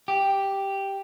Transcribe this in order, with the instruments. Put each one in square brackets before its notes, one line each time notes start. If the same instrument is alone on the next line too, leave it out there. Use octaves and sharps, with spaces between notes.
[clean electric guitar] G4